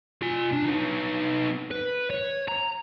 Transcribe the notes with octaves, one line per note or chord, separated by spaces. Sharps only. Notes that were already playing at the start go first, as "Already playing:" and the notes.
F4 G#5
D4
B3 D#4
B4
C#5
A#5